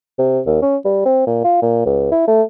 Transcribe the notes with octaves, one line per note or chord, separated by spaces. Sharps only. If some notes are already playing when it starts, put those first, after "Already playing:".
C3
D#2
C#4
G3
C4
A#2
F4
A#2
C#2
E4
A3